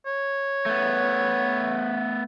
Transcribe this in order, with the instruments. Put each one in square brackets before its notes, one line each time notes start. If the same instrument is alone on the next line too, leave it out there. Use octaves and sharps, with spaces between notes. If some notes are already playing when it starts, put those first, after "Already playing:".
[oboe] C#5
[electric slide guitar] A3 B3